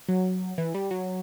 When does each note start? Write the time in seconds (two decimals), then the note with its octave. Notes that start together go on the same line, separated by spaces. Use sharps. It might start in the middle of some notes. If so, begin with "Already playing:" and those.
0.09 F#3
0.58 E3
0.75 G3
0.91 F#3